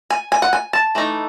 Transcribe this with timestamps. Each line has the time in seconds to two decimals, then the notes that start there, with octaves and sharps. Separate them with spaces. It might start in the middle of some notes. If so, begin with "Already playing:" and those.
0.10 G#5
0.32 G#5
0.42 F#5
0.53 G#5
0.73 A5
0.95 E3 A3 D#4